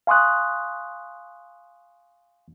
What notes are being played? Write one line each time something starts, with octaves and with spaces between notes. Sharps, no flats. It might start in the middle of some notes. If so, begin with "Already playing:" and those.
F5 G#5 C6 C#6 D#6 F#6